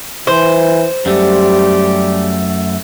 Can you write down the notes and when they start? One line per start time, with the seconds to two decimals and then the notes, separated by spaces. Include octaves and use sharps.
0.27 E3 C5
1.06 F#2 G3 A3 G4